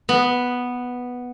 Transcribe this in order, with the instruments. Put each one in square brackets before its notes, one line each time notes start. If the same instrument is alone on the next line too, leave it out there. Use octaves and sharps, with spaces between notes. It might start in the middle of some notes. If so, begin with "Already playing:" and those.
[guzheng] B3